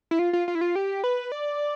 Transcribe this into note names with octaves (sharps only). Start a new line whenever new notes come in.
E4
F4
F4
F4
E4
F4
G4
B4
D5